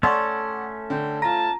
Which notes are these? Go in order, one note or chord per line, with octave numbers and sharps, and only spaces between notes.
A3 C#4 A4 D5 F#5 C6 C#6
D3 G5
F4 A5 A#5 A#6